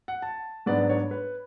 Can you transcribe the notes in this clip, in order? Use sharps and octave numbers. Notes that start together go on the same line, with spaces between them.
F#5
A5
G#2 F#3 B3 D4 D5
C#5
B4